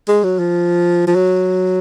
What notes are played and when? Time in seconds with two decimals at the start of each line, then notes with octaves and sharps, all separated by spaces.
0.08 G#3
0.24 F#3
0.39 F3
1.07 F3
1.15 F#3